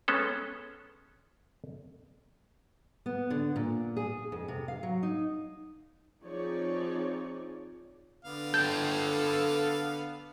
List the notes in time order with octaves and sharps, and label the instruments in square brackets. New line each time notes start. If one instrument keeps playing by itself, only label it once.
[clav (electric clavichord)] G#3 B3 C#4 A4
[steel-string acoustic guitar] B3
D3
A#2
G#4
F2
C3
F5
F#3
D#4
[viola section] F3 C4 D#4 G#4 C#5 D5
[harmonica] D3 B3 F5
[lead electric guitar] A4 G5 [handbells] G6